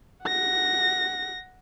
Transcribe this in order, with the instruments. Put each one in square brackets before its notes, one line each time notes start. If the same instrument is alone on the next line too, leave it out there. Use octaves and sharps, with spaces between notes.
[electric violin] F#5 A#6